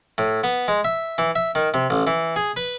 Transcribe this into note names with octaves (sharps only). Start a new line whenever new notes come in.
A2
B3
G#3
E5
E3
E5
D#3
C3
A1
E3
G#4
B4